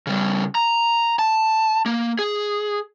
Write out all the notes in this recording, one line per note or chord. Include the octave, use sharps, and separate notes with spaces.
C#3 G3
A#5
A5
A#3
G#4